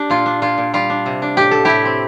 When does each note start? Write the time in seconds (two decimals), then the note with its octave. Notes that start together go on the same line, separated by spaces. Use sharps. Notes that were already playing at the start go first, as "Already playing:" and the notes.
Already playing: D4 G4
0.10 A#2 F4
0.26 D4
0.42 A#2 F4
0.58 A#2
0.74 G3 F4
0.90 D4
1.06 C3
1.22 D4
1.37 A2 G4
1.51 A2 A4
1.65 A2 E4 G4
1.85 C4